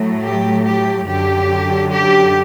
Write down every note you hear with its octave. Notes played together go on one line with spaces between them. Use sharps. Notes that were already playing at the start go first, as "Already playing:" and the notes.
Already playing: A2 F#3 A3
G4
G4
F#2 D3 F#3 G4
G4